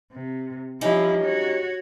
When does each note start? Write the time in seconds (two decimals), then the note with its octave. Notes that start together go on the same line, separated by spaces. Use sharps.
0.12 C3
0.81 F3 G3 C#4 D#4 E4
1.23 F#4 C#5